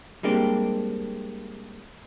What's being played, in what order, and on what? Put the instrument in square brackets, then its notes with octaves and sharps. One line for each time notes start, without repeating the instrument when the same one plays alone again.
[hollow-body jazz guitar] G3 G#3 A#3 C4 D4 G4